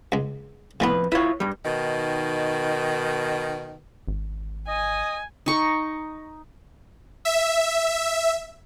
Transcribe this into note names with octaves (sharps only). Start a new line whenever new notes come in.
C#2 G#3
F2 A2 E3 B3 B4
E4 F4 B4 C#5 F#5
G2 G3
B2 D#3
G#1
D#5 G#5
D#4 C#6
E5